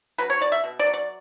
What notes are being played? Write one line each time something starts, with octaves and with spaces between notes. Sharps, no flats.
F#3 B4
C#5
F#3 D5
E5
B2
D5
F#3
D5